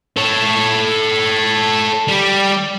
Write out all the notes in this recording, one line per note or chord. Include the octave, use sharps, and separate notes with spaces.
A4 C#5
G3 G4